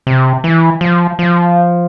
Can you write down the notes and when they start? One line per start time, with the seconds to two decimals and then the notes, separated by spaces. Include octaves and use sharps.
0.07 C3
0.44 E3
0.81 F3
1.19 F3